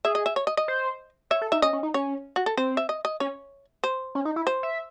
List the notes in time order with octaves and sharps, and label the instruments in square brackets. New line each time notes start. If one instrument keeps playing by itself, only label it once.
[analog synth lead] G#4 [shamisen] E5
[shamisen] D#5
E5
C#5
D#5
D#5
[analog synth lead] C5
[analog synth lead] C#5 [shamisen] E5
[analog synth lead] A4
[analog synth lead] D#4 [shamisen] E5
[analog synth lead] C#4 [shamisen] D#5
[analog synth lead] C#4
D#4
[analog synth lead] C#4 [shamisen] C#5
[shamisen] F#4
A4
[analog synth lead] C4 [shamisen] C5
[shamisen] E5
D#5
D#5
[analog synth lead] C#4 [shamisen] C#5
[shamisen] C5
[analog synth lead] C#4
D#4
E4
[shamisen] C5
[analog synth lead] E5